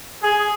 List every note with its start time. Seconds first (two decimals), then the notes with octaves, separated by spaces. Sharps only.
0.23 G#4